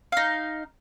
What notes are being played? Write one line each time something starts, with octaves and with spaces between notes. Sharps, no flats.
D#4 F5